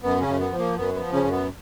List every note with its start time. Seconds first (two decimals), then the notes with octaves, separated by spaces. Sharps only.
0.03 F#2 B3
0.21 C#3 C#4
0.27 F#2
0.40 B3
0.52 F3
0.59 A#3
0.77 F#2 B3
0.94 B3
1.01 F3
1.13 C#3 C#4
1.25 F#2
1.31 B3